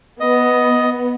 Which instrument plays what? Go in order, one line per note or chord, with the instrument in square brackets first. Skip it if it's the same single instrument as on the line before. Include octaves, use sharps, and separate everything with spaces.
[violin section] B3 [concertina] D#5